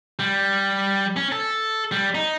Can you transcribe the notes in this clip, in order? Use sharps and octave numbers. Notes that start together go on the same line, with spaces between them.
G3
C#4
A4
G3
D#4